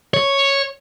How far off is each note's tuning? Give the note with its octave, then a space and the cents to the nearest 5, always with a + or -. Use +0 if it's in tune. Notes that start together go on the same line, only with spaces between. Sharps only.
C#5 -5